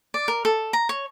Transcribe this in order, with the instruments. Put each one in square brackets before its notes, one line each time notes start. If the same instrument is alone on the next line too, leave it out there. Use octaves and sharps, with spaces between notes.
[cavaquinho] D5
A#4
A4
A#5
C#5